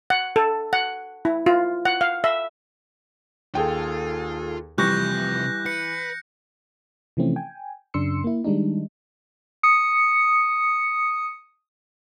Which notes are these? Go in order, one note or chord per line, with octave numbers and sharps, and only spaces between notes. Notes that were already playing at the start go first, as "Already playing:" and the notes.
F#5
A4
F#5
E4
F4
F#5
F5
E5
D#2 F4 G#4 A4 G5
C3 E3 F3 G3 C#6 F#6 G6 A#6
B4 C#7
C3 E3 F3 A3 C4 C#4
G5 G#5
F#2 C#3 D4 C6 E6 C#7
A#3 E4
D#3 G3 G#3 D4 D#4
D#6 C#7